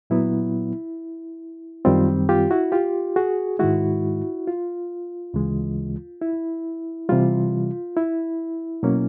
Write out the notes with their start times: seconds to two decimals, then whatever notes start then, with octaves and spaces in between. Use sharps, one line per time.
0.10 A#2 F#3 B3 E4
1.85 F#2 D#3 G3 C4 F4
2.29 F4 G4
2.51 E4 F#4
2.72 F4 G4
3.16 F#4 G#4
3.59 G#2 D#3 G#3 E4 F#4
4.48 F4
5.34 D2 C#3 E3 G#3
6.22 E4
7.09 C3 E3 G3 F4
7.97 E4
8.83 B2 F#3 A#3 C#4